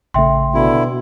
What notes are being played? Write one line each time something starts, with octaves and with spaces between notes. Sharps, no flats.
A1 C#3 A3 E5 G5 C6
B2 D3 E4